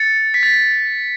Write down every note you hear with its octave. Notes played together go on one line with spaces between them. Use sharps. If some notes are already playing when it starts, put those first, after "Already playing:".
Already playing: A6 C#7
B6
A6